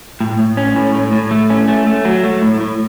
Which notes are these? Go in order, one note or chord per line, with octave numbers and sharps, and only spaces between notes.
A2
A2
C#4
A2
A2
A2
A3
C#4
A3
A3
F#3
A3
A2
A2